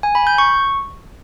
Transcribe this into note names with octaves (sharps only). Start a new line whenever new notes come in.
G#5
B5
G6
C#6